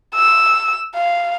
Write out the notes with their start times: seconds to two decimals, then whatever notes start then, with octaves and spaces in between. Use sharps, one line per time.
0.15 E6
0.95 F5